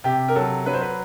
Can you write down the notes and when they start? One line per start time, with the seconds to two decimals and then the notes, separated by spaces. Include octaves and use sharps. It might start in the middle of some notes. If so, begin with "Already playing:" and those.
0.04 C3 G4
0.28 A#4
0.35 F#3 A4
0.66 F#3 B4
0.73 C5
0.81 B4